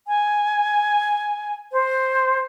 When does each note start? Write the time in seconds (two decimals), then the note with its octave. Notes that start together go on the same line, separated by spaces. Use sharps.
0.08 G#5
1.73 C5